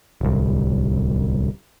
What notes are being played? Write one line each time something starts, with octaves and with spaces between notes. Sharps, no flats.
D1 C2